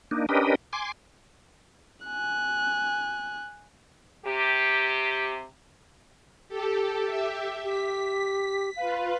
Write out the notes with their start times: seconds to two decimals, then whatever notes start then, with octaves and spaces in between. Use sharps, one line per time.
0.11 A#3 D4 D#4
0.29 C#4 D4 G4 A#4 B4 D#5
0.73 G#5 C6 D6
2.06 G#5 F#6
4.26 C3 G4
6.49 G4 A4
7.06 G4 E5
7.64 G4 B6
8.76 F4 B4 F5